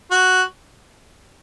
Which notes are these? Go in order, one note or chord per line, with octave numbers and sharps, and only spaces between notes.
F#4